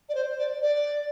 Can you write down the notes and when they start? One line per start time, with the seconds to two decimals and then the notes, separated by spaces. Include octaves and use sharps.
0.08 D5
0.14 C5
0.37 D5
0.62 D5